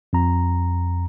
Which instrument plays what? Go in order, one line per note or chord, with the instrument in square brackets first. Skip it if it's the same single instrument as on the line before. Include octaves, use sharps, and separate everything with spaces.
[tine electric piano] F2 A#5